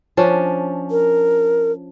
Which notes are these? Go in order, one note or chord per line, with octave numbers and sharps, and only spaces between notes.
F3 C#4 D4
A#4